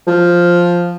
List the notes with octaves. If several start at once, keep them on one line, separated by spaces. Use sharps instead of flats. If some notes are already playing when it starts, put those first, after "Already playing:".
F3